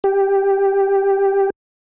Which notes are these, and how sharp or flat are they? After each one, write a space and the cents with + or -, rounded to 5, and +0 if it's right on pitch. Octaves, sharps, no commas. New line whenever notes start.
G4 +5